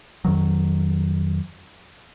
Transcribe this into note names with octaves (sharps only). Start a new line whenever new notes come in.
F2 D#3 F#3